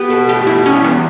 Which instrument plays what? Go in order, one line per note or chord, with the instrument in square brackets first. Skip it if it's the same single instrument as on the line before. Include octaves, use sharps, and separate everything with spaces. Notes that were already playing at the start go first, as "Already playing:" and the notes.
Already playing: [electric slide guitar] B3 [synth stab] G4
[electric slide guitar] B2 [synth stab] A4
[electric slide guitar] A3 [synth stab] G4
[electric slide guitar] B2 [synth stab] E4
[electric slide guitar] G3 [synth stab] C#4
[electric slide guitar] E2 [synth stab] B3